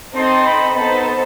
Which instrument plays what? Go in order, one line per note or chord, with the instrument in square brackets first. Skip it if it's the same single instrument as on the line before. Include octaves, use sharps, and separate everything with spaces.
[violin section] C4 D#4 A4 D#5 [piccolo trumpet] C6
[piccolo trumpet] B5
[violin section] B3 D#4 A4 C5 [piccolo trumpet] B5